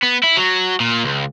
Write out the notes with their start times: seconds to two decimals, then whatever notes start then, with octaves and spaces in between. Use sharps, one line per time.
0.02 B3
0.23 E4
0.37 F#3
0.80 A#2
1.04 C#2